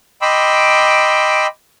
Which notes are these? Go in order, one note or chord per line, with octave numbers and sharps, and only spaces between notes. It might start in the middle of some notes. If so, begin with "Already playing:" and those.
D#5 G5 B5 C6 D6 E6